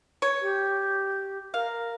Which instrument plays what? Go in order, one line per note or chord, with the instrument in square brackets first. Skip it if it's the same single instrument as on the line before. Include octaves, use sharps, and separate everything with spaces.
[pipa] C#5
[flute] G4
[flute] A#4 [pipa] F5